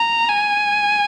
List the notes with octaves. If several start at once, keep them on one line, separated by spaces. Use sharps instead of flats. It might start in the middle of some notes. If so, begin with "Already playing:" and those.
Already playing: A#5
G#5